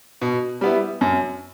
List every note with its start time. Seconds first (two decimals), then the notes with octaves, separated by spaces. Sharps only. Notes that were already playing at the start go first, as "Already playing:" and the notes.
0.21 B2
0.61 G3 B3 E4
1.01 F#2